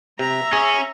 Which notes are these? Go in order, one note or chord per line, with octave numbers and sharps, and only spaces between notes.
C3 E5 A#5
C#4 G#4